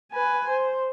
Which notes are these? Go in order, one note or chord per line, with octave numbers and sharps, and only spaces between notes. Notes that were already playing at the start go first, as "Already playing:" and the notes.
B4 G#5
C5